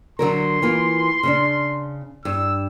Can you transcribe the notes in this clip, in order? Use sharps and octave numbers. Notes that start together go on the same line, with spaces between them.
D3 F#3 A#4 C6
E3 A#3 F4
C#3 C#4 D4
G2 E6